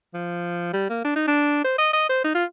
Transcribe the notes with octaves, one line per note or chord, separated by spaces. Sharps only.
F3
G3
A#3
D4
D#4
D4
C5
D#5
D#5
C5
D#4
F4